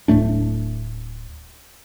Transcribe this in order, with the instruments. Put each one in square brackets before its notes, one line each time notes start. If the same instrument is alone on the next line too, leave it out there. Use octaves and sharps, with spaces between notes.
[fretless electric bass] D1 A2 A3 D4